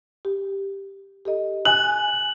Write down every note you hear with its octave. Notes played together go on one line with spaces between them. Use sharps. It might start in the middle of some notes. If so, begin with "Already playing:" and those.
G4
G4 A4 D#5
G#5 F#6 F#7